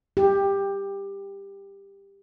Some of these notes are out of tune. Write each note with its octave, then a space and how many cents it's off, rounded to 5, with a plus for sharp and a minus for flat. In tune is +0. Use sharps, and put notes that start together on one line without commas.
G4 +15